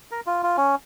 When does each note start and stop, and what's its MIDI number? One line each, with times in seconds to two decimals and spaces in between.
0.11 0.21 70
0.26 0.42 65
0.43 0.57 65
0.57 0.75 61